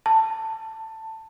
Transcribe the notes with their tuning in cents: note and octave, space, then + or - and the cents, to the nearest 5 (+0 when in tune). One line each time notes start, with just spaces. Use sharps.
A5 +15